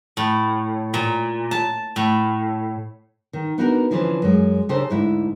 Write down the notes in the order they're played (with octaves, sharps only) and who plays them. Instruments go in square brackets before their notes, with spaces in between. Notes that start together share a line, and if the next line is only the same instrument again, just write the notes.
[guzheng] A2
A#2
A5
A2
[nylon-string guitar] D#3
B3 D4 D#4 F#4 A4 A#4
D3 E3 F3 C#4 B4 C5
F#2 G#3
C#3 D4 G4 A4 A#4 C5
D2 G#2 D4 E4